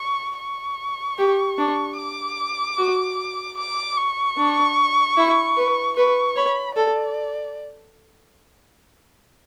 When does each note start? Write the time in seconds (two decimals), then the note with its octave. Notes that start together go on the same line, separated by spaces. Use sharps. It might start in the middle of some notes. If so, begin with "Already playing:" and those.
Already playing: C#6
0.39 C#6
1.18 G4
1.58 D4
1.98 D6
2.78 F#4
3.58 D6
3.97 C#6
4.37 D4
5.17 E4
5.57 B4
5.97 B4 C#6
6.36 C#5 B5
6.77 A4 D5